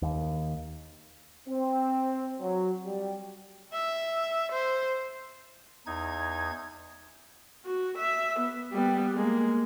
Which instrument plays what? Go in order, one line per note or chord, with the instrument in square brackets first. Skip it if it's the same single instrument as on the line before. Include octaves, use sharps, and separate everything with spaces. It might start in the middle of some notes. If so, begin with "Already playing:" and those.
[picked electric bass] D#2
[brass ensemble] C4
F#3
G3
[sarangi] E5
C5
[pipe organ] E2 D#4 G#6
[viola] F#4
E5
B3
G3 B3
G#3 A#3